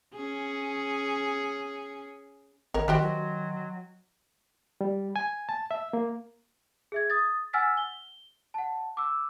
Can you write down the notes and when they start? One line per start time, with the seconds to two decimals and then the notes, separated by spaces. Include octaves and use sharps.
0.15 C#4 G#4
2.74 G#1 A#4 C#5 D#5
2.88 D#3 D4 F#4 G4 C5 D#5 G5 C6
3.02 F#3
4.81 G3
5.16 G#5
5.49 A5
5.71 E5
5.93 A#3
6.92 G#4 E5 G#6
7.10 D#6 A6
7.53 F#5 G#5 E6 F6 A6 B6
7.77 G7
8.54 F#5 A5
8.97 D6 E6